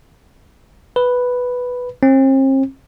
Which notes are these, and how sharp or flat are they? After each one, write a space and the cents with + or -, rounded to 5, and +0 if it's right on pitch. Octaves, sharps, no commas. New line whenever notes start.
B4 +0
C4 +40